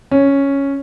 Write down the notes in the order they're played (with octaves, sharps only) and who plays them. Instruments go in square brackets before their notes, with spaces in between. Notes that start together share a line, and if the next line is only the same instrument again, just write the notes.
[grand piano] C#4